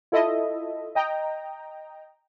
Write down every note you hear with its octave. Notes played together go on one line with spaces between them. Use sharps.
E4 F4 A4 D#5 E5
D#5 G5 A#5